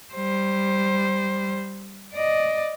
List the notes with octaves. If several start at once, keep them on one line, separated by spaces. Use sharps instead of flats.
G3 C5
D5 D#5